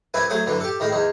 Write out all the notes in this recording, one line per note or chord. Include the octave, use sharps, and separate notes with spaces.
C2 C4 E4 B4 G#5
F#3 A3 G#4 C5
F#2 D3 E3
G4 A4
A2 D#3 G#3
E2 D#3